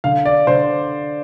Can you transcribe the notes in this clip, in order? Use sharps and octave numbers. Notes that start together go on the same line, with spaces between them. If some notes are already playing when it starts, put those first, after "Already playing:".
D3 F5
D5
D3 C5